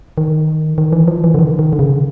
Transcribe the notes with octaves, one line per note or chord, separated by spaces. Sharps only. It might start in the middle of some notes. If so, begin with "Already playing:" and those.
D#3
D#3
E3
F3
E3
D3
D#3
D#3
D3
C#3